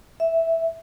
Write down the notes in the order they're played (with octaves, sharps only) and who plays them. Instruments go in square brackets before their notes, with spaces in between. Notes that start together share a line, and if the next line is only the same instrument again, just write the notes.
[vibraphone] E5